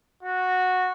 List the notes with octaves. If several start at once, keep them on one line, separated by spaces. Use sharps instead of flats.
F#4